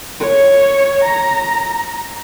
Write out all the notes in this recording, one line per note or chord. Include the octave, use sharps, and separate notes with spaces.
C#5
A#5